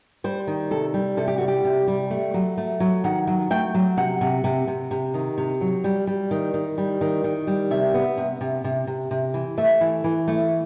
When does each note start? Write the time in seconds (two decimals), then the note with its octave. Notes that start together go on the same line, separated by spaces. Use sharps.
0.24 G3 C5
0.47 D#3
0.71 C3 A4
0.94 G3
1.17 C3 A4
1.28 G4
1.38 G3 F#4
1.48 G4
1.64 C3
1.88 G3
2.10 A3
2.34 F#3
2.58 A3
2.80 F#3
3.04 D#3 F#5
3.27 F#3
3.50 A3 G5
3.74 F#3
3.97 C3 F#5
4.21 C3
4.44 C3
4.67 C3
4.91 C3
5.14 D#3
5.38 C3
5.61 F#3
5.84 G3
6.07 G3
6.31 D#3
6.54 D#3
6.78 G3
7.01 D#3
7.24 D#3
7.47 G3
7.71 C3 E5
7.94 B3
8.17 C3
8.41 C3
8.64 C3
8.87 C3
9.11 C3
9.34 E3
9.58 A3 E5
9.81 E3
10.04 E3
10.28 A3